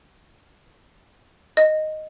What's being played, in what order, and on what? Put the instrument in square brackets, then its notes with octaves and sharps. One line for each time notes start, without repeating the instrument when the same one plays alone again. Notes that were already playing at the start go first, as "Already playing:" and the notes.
[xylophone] D#5